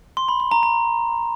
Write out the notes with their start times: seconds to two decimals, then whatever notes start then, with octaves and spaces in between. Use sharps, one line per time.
0.17 C6
0.28 B5
0.40 C6
0.51 A#5
0.63 A#5